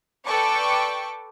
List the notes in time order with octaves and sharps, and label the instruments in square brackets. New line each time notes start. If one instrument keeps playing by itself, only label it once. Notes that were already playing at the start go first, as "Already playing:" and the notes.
[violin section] A4 B4 D5 G5 C#6 D6